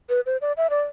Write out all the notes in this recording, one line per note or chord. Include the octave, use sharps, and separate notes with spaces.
B4
C5
D5
E5
D5